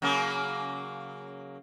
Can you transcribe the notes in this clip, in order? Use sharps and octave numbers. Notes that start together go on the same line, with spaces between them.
C#3 F#3 A#3